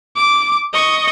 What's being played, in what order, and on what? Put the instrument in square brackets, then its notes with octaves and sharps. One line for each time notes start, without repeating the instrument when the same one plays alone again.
[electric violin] D6
D#5 C#6